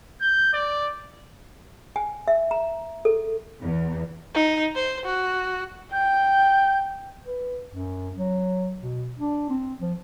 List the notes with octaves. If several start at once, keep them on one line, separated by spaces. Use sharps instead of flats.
G6
D5
G#5
E5
A#5
A4
E2
D#4
C5
F#4
G5 G6
B4
F#2
F#3
B2
D4
C4
F3